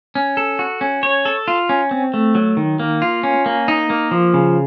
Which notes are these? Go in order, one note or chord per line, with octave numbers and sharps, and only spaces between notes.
C#4
A4
F#4
C#4
C#5
A4
F4
C#4
C4
A3
F#3
D#3
A#3
F4
C#4
A#3
D#4
A#3
F3
C#3